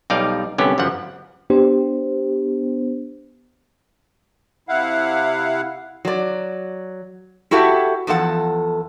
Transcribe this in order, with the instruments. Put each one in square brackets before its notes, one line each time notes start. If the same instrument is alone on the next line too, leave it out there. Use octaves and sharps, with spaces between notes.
[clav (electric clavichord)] B1 G3 D#4 D5 F5
C2 D3 B3 C#4 G4
G1 F#2 F3 F#5
[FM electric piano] B3 D4 G4 C5
[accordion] C3 E4 F5 F#5
[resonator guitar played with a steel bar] F#3 D5
E4 F#4 G4 A4 E5 F#5
E2 F3 A4 F#5